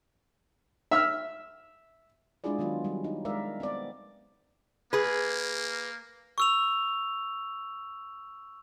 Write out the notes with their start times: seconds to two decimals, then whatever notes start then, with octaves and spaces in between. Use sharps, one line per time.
0.91 E5 E6 F6
2.44 G#3 D4 E4 F4 G#4 D5
2.59 D#3 F#3 B3 F4
2.84 F#3 G3
3.04 D#4
3.25 G#3 A#4 D5 E5 F5
3.60 B3 C4 D5
4.93 A#3 G#4 B4
6.38 C#6 E6 F7